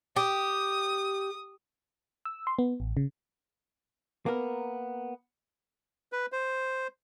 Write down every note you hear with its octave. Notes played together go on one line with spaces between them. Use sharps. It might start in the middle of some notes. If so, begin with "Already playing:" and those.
G4 D#6
E6
C6
B3
A1
C#3
A#3 B3 A#4
B4
C5